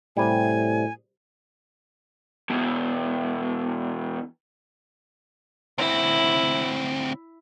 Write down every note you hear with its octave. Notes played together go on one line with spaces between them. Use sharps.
A2 C3 G3 G#5
E2 B2
D2 C4 E4